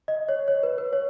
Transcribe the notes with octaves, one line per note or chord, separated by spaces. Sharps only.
D#5
C#5
C#5
B4
B4
C#5